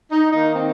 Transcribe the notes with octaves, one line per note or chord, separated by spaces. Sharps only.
D#4
D#3 A#3 D#4
C4